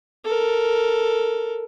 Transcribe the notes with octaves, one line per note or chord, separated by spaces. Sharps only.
A4 A#4